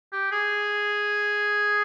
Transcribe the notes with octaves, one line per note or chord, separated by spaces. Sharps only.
G4
G#4